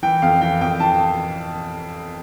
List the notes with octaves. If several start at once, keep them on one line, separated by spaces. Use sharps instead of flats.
E3 G5
F2 F5
E3 G5
F2 G5
E3 A5